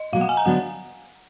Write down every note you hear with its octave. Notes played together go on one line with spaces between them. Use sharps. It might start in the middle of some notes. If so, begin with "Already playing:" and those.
Already playing: D#5
B2 F#3 A#3 F5
F#5
G#5
A#5
D3 F#3 B3 D4 F#5